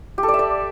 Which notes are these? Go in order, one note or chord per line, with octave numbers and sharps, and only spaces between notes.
G4
A4
D5
E5
D5